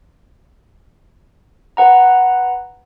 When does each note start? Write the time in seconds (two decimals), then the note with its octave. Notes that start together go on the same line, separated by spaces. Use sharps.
1.77 B4 F#5 A#5